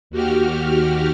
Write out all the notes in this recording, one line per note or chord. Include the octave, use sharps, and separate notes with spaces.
D#2 F#4 G4 F6